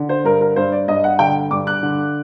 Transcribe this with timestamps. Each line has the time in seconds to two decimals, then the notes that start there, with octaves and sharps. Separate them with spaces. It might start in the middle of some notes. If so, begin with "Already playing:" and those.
Already playing: D3
0.09 C5
0.24 G2 A#4
0.41 A#4
0.56 G2 C5
0.72 D5
0.88 G2 D#5
1.04 F#5
1.19 D3 G5
1.51 G2 D6
1.67 F#6
1.83 D3